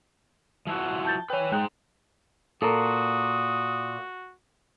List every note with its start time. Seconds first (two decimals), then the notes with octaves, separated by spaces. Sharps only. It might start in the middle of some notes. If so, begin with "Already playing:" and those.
0.67 F3 E4 F#4
1.05 A5 G6 A6
1.30 B4 C#5 G5 G#5
1.52 G#3 D#4 G#4 G5 F#6
2.62 A#2 F#4 A4 A#4 D#6